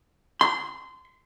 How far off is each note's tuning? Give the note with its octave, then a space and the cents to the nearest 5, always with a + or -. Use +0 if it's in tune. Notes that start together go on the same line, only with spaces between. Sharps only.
C6 -25